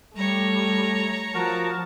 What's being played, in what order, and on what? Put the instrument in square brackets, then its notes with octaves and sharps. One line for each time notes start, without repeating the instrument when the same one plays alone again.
[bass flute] G3 [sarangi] A3 [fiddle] C#5 A#5
[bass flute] F3 [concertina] F#4 A#4 [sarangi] A5